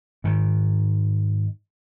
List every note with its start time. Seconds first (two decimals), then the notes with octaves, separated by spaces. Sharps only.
0.24 G#2 D#3